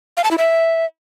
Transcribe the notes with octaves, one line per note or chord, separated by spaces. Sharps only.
F5
A5
E4
E5